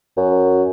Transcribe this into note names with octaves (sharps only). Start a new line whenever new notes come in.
F#2